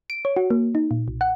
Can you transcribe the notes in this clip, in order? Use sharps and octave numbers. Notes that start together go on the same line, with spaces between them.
D7
C#5
F#4
A#3
D#4
A#2
B1
F#5